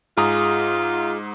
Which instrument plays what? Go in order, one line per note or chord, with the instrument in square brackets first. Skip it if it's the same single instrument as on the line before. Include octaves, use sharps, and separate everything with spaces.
[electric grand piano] G#2 A#5 D#6 [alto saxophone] F4 [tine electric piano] G#4